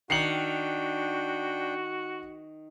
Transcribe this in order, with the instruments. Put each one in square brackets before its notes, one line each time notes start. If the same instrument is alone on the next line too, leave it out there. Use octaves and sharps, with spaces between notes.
[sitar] D#3 [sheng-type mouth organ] D4 G5 [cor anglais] F#4 [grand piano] C7 C#7 F#7